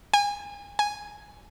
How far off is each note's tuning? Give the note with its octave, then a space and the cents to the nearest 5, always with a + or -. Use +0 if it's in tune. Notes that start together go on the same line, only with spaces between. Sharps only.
G#5 -30
G#5 -5